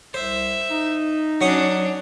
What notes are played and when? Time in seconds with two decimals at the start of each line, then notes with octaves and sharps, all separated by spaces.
0.14 C2 C5 E5
0.70 D#4
1.41 F#3 C#4 D4 C#6 D#6